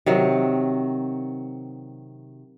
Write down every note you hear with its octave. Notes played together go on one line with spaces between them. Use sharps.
C3 D#3 F#3